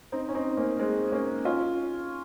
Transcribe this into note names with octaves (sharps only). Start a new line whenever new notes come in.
C4 D#4
C#4
C4 D#4
A#3 C#4
G#3 C4
A#3 C#4
C#4 F4